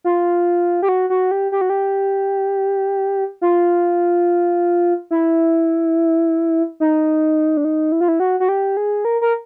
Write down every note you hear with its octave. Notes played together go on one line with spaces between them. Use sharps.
F4
G4
F#4
F#4
G4
G4
F#4
G4
F4
E4
D#4
D4
D#4
E4
F4
E4
F#4
F#4
G4
G#4
A#4
A#4